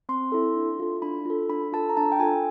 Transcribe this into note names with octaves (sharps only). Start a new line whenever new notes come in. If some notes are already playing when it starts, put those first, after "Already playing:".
C4 C6
E4 A4
D4
F4 A4
D4 B5
F4 A4
D4 B5
F4 A4 A5
A#5
D4 A5
G5
F4 A4 G#5